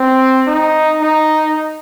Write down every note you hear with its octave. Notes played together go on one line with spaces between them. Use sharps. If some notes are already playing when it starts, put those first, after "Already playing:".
Already playing: C4
D#4
D#4